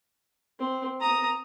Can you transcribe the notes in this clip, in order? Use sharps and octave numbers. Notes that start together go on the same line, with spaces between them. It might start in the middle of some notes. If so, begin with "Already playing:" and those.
C4
A#5 D#6